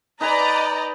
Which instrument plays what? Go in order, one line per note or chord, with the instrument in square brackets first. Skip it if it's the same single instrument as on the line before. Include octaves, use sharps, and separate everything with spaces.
[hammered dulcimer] D#4 B4 G#5 [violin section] D5 D#5 A#5